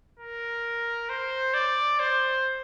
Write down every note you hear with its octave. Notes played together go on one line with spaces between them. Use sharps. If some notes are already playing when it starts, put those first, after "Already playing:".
A#4
C5
D5
C5